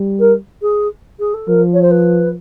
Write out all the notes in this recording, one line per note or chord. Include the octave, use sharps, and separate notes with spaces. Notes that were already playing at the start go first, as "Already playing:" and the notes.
Already playing: G3
A#4
G#4
G#4
A4
F3 A#4
C#5
C5
B4